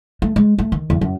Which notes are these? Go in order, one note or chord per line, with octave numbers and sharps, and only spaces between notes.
A3
G#3
A3
D#3
E2
F#2